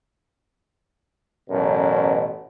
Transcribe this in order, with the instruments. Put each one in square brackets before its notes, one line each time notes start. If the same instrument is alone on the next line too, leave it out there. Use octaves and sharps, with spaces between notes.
[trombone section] A1 F#2 B2